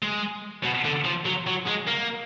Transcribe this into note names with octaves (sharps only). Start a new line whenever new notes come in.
G#3
B2
D3
F3
F#3
F#3
G#3
A#3